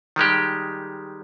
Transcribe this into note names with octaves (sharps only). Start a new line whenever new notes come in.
D#3 G3 G#3 G4